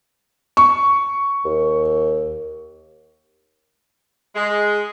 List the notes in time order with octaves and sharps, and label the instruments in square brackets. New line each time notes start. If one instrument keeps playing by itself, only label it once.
[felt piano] C#6
[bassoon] D#2
[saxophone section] G#3